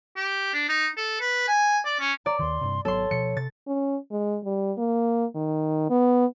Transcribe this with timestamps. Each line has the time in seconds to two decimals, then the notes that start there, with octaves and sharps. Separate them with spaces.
0.16 G4
0.54 D4
0.69 D#4
0.97 A4
1.20 B4
1.48 G#5
1.85 D5
2.00 C#4
2.26 D5 A#5
2.39 D#2 D#3 C6
2.61 G2 C3
2.85 G#1 F#3 B3 A4 C#5 C6
3.11 B2 F3 C#7
3.37 C3 A6
3.67 C#4
4.11 G#3
4.45 G3
4.78 A#3
5.35 D#3
5.90 B3